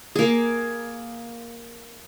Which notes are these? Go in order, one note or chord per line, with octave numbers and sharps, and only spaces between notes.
A#3 G#4